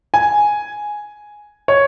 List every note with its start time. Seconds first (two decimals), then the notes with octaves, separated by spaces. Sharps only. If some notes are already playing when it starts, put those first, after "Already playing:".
0.14 G#5
1.68 C#5